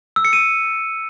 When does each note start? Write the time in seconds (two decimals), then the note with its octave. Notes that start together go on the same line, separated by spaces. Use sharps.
0.16 E6
0.25 C#7
0.33 D#7